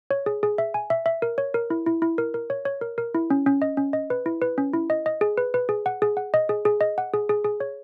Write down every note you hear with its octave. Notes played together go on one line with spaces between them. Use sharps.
C#5
G#4
G#4
E5
G#5
E5
E5
A#4
C#5
A#4
E4
E4
E4
A#4
A#4
C#5
C#5
A#4
A#4
E4
C#4
C#4
D#5
C#4
D#5
B4
E4
B4
C#4
E4
D#5
D#5
G#4
B4
B4
G#4
F#5
G#4
F#5
D#5
G#4
G#4
D#5
F#5
G#4
G#4
G#4
C#5